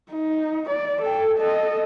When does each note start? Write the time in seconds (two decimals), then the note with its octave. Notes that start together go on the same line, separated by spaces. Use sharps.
0.11 D#4
0.70 D5
1.02 A4 G5
1.39 A4 D#5